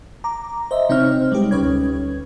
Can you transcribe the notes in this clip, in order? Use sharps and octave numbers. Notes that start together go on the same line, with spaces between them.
A#5 D6
C5 D#5 E5
C3 C4 D#4 C5 C#5 F6
G3 G#3 D#4 G4 B4
D2 C#4 B4 C#5 G#6